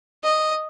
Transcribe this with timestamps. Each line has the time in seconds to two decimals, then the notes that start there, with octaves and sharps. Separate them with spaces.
0.24 D#5